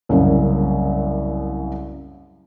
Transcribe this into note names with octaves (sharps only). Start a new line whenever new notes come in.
C2 F#2 C#3 A#3